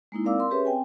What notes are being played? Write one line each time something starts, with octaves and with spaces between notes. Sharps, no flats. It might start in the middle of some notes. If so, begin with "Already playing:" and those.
G#3 A#3 D#4 E4
C4 A#4 D5 F5 D6 E6
A#4 C6
C#4 G4 G#4 B4 C#5 E5
C4 G5 G#5